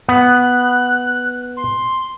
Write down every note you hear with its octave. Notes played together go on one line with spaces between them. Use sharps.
B3 F#6
C6